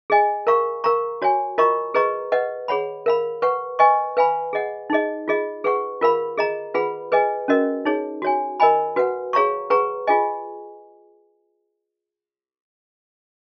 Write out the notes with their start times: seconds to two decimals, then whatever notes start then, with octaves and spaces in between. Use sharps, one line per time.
0.10 G#4 D#5 G#5
0.47 A#4 F5 A#5 C#6
0.84 A#4 F5 A#5 C#6
1.22 F#4 C#5 G#5
1.58 F4 A#4 D#5 A#5 C#6
1.94 G#4 B4 D#5 A#5 C#6
2.32 B4 D#5 F#5
2.68 G#4 C#5 F#5 B5
3.06 A#4 F5 B5
3.42 B4 F#5 C#6
3.79 B4 D#5 G#5 C#6
4.17 B4 F5 G#5 B5
4.53 G#4 D#5 F#5
4.90 D#4 G#4 D#5
5.28 F4 G#4 D#5
5.64 G#4 B4 F#5 C#6
6.01 F4 A#4 F5 B5
6.38 G#4 D#5 A#5
6.74 F4 G#4 B4 F#5 B5
7.12 G#4 B4 D#5 G#5
7.48 C#4 F#4 A#4 D#5
7.85 D#4 G#4 C#5
8.22 F#4 C#5 G#5
8.60 A#4 D#5 G#5 B5
8.96 F#4 B4 F#5
9.33 G#4 C#5 F5 A#5 C#6
9.70 G#4 B4 F#5 A#5 C#6
10.07 F4 G#4 D#5 G#5